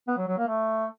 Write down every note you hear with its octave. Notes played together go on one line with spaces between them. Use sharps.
B3
F#3
F#3
A#3
A3